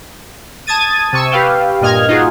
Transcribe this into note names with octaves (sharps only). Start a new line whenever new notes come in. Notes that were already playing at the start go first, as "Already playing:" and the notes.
A5 D#6 G#6 A6 D#7
C3 C#6 E6
G4 B4 F5 G5
G2 A#2 D#5 F6 G#6
D#4 F4 F#4 G#4